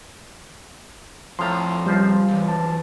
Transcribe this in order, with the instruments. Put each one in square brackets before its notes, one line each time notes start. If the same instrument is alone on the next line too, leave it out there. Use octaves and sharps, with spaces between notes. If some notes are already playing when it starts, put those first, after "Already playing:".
[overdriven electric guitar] F2 A#5 [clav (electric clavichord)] A2 F3 [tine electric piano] C6
[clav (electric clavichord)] C#2 F3 C5 [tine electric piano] G3
[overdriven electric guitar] E3 F#3
[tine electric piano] A5